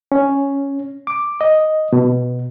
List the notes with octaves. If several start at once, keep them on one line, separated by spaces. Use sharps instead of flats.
C#4
D6
D#5
B2